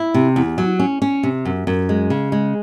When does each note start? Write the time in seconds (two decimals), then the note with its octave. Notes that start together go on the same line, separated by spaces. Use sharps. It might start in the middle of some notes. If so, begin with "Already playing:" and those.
Already playing: E4
0.14 C3
0.36 E2
0.58 F#3
0.80 C#4
1.02 C#4
1.23 C3
1.45 F#2
1.67 F#2
1.89 G#3
2.10 C#3
2.32 G#3